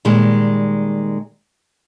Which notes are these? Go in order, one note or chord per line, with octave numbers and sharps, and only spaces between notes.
A#2 D#3 G3 G#3